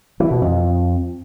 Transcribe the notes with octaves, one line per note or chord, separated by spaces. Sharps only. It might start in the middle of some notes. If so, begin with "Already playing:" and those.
E3
B2
F2